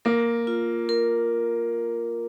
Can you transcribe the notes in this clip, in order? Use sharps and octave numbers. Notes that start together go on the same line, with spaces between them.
A#3 A#4
F4
A#4